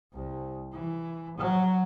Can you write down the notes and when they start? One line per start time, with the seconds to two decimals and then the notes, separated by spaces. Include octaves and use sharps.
0.13 C2
0.73 E3
1.38 F#3